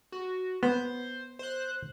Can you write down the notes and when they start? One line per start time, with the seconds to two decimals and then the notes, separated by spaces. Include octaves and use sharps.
0.12 F#4
0.63 B3 C5
1.39 C5 F#6